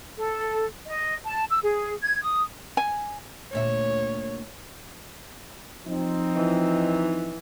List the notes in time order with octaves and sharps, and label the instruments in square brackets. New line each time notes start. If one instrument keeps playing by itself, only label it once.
[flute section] A4
D#5
A5
E6
G#4
G#6
D#6
[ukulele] G#5
[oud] D2 A#2 E5 [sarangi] C#5
[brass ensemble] F3 C4 D#4
[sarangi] E3